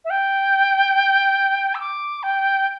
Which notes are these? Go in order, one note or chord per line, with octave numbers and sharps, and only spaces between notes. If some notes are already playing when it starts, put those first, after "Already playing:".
E5
G5
E6
D6
G5